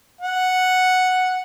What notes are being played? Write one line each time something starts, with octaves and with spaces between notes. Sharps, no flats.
F#5